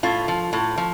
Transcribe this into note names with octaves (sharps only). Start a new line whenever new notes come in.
A2 F4
F3
A2
F3